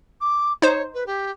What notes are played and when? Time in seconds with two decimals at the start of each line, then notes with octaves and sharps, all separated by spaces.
0.21 D6
0.62 D#4 C5 C#5
0.94 B4
1.06 G4